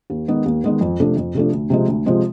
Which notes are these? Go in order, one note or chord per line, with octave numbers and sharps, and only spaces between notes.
D#2
D#3 G#3 B3
D#2
D#3 G#3 B3
F2
C3 F3 A3 D4
F2
C3 F3 A3 D4
D2
C3 F3 G#3 C4
D2
C3 F3 G#3 C4